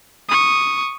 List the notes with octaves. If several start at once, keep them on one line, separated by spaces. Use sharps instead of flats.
C#6 D#6